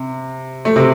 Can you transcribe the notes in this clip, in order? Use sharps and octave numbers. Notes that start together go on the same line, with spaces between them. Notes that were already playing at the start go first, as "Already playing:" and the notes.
Already playing: C3
A3
C3 C4